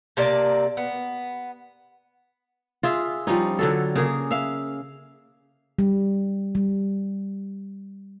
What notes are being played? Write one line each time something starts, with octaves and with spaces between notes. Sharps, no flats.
C3 A#3 D5 A5
B3
F4 G#4 E5
F3 G3 C#4 D#4
D3 F#3 A4
C#3 A#3 G#4
E5 F5
G3
G3